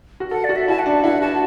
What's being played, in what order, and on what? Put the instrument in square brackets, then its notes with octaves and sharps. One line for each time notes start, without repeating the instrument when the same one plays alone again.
[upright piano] F#4
[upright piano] A4 [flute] F#5
[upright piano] F#4 [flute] D5
[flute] E5
[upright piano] E4 [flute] A5
[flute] F#5
[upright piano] D4
[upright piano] E4 [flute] F#5
[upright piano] F#4 [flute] A5